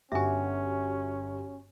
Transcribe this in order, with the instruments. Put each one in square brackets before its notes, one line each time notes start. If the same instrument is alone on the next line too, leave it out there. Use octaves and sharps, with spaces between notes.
[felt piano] G1 [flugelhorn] C#4 [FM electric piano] F#4 G4 [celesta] E5 G#5